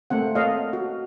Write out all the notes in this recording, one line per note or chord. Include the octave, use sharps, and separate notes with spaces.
A3 A#3 C4 F#5
A#3 A4 C#5 D#5 F5
F#4